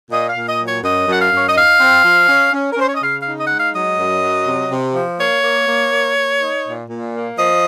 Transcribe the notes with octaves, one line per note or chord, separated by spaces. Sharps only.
A#2 D#5
F5
A#2
D#5
F#3
C#5
F#2 D#5
F#2 F#5
F5
F#2 C#5
D#5
D#4 F5
C4
F3
C#4
C#4
A#4
C#4 C5
C#5
D#5
C#3 F5
F5
D#4
D#5
G#3 F#5
F5
F#3 D#5
F#2
F#3
C3
C3
F3
A#3 C#5
A#3
A#3
A#3
A#3
D#4
A#2
A#2
A#3
F3 D#5